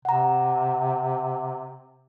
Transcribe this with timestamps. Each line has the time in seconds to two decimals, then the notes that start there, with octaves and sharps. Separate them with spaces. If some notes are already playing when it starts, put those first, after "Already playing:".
0.05 C3 F#5 A#5